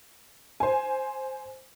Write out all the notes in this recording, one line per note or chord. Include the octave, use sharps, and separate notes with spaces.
C5 G#5